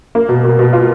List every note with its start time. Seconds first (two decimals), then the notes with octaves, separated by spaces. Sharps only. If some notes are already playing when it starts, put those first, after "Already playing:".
0.15 A#3
0.29 B2
0.44 B2
0.59 B2
0.73 F4